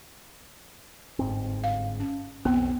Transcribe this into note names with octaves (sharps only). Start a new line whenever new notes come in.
G1 G#2 C4
F5
C#4
B1 F2 B3 C4